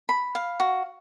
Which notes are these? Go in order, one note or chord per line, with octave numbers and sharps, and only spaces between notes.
B5
F5
F#4